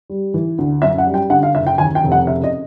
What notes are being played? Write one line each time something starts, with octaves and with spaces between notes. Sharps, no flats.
G3
E3
D2
F#2 E5
F#5
G3
G5
D3 F#5
F5
F#1 E5
G5
D#2 G#5
G5
F1
F#5
C#3 E5
D#5